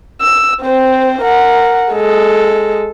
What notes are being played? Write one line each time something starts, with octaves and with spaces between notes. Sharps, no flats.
E6
C4 C5
A#4 F#5
G#3 A4